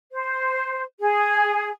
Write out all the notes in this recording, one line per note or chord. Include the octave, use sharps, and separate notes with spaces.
C5
G#4